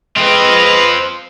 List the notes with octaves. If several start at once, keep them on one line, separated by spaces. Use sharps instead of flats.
G#3 C4 F4 B4 D#5